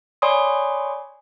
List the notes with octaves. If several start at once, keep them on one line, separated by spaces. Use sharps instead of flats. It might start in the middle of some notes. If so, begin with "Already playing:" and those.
C#5 D5 G#5 B5 C6 D#6